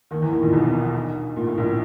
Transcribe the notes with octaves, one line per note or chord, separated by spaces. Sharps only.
D#2 D#3
E2 E3
D#2 D#3
A#1 A#2
B1 B2
A#2
A2
A#1 A#2